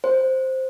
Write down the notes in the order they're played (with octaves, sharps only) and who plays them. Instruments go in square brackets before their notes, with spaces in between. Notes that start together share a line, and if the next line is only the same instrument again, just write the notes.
[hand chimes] C5